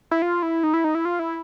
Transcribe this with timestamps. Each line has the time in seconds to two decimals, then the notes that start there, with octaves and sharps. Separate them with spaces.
0.11 E4
0.22 F4
0.43 E4
0.63 D#4
0.74 E4
0.84 D#4
0.95 E4
1.05 F4
1.19 E4